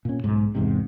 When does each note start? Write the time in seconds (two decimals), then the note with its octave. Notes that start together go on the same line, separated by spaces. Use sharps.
0.05 A#2 C#4
0.24 B1 G#2
0.55 E2 G#2 C3